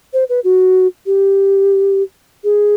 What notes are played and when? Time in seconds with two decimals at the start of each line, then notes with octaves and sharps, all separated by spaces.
0.13 C5
0.29 B4
0.44 F#4
1.06 G4
2.44 G#4